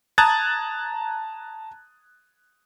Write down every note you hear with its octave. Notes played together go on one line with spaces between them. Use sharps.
A5 A#5 D#6 F#6 G#6 A6